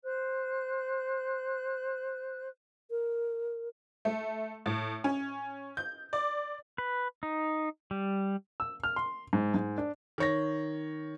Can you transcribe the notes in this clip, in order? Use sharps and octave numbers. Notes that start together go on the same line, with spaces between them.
C5 F#6
A#4
A3
A2
C#4
G6
D5
B4
D#4
G3
E6
F6
C6
G#2
G#2
D4
D#3 C#5 A#6